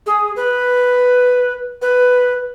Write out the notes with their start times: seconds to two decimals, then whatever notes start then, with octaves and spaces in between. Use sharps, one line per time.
0.06 G#4
0.36 B4
1.82 B4